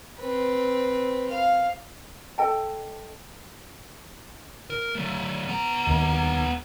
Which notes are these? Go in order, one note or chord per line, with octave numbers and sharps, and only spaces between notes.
C4 B4
F5
A4 D#5 G5 A5
A#4
F#3 A3
B3 A#5
D#2